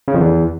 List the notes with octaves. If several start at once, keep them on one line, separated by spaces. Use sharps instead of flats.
C#3
F2
E2